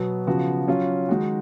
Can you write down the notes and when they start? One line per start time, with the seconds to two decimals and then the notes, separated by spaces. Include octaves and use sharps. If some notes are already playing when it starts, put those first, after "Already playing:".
Already playing: B2 F#3 B3
0.27 C#3 F3 B3 F#4
0.68 F#3 C#4 F4
1.09 D#3 G#3 D#4 F#4